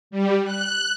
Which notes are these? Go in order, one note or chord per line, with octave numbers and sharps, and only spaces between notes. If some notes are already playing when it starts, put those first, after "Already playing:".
G3
F#6